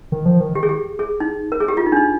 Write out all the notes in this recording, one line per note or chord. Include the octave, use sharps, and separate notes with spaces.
D#3
F3
D#3
G4
G#4
G4
G#4
D#4
A#4
G#4
G4
F4
D#4
D4
D#4